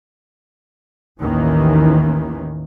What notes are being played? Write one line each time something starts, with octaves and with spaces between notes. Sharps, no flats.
A1 D#2 D#3 E3 A#3 C#4